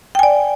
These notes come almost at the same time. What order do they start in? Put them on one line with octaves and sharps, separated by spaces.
G5 G#5 D5